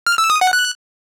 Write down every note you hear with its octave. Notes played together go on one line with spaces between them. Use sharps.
F6
E6
D#6
F#5
F#6